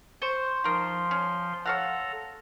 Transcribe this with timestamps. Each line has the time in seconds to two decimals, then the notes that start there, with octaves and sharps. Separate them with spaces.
0.22 C5 C#6
0.64 F3 D#4 A#4 C6
1.11 C#4
1.66 A4 C#5 F5 F#5 A#5